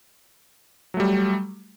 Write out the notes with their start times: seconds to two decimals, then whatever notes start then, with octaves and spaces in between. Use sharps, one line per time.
0.94 F#3
0.97 A3
1.00 G3